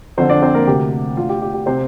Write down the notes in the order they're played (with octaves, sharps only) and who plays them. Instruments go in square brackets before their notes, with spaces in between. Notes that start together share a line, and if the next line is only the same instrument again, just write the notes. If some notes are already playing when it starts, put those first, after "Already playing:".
[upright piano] F2 D3 C4 C5
D4 D5
C4 C5
A#3 A#4
D2 C3 G4
D2 D3 F4
G4
G4
G4
C3 C4 C5